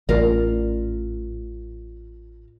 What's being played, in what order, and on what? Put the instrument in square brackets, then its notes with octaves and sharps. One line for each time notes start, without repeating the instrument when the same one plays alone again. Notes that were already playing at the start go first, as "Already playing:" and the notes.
[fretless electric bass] A1 [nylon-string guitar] F4 A#4 D5